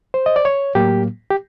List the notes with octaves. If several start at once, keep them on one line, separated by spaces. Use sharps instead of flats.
C5
D#5
D5
C#5
A2 F#3 A#3 G4
G4